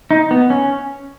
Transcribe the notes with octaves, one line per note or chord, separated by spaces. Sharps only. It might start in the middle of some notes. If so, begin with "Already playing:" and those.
D#4
B3
C#4